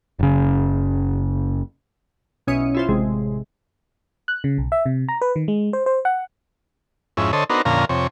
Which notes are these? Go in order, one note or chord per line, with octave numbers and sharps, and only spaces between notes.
F#1 C#3
B1 B2 C#4 E4 D#6 C#7
E4 F4 C5
A1 C3 G#3
F#6
C#3
B1
E5
C3
A#5
B4
D#3
G#3
C5
C5
F#5
F2 G#2 C#4 E4
D3 A4 C5 C#5 D#5
B3 D4 D#4 F#4 A#4 C5
F2 A#2 D3 C#4 F5 A#5
F2 C3 C#5